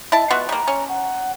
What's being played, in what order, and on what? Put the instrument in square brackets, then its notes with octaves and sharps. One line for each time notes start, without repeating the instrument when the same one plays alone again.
[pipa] E4 A5 [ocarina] D#5
[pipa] B3 F4 F#4
[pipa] G3 A#3 [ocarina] A#5
[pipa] C#4
[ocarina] F#5